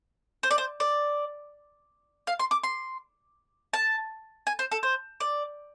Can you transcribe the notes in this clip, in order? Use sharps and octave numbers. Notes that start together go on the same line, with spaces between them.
C5
D5
C5
D5
F5
C6
D6
C6
A5
G#5
C5
A4
C5
D5